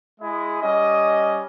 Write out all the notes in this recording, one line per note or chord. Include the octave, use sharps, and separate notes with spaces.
G#3 E4 G#4 D#5
G3 C#4 D#5